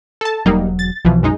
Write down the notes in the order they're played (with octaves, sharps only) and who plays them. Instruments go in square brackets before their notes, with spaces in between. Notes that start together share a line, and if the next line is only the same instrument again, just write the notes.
[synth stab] A4 A5
[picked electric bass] E1 F#3 [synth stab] G3 A#3 D#4
[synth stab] A6
[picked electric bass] B1 B2 [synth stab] E3 F3
[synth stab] F#2 G#3 D#4